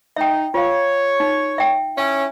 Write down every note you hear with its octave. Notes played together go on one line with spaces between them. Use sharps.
D#4 E5 G5
F4 C#5 F5
D#4
E5 G5
C#4 E4